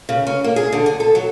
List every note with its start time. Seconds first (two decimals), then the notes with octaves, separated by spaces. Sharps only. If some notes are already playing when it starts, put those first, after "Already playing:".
0.09 C#3
0.27 C#4
0.44 A#3
0.56 G#4
0.72 D3
0.86 G#4
1.00 A4
1.15 F#3